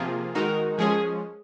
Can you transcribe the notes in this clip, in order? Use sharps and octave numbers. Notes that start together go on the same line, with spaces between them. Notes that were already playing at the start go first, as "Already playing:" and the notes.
Already playing: C3 F3 A#3 F4 G#4
D#3 G#3 D#4 F#4 A#4
F3 G#3 C#4 G#4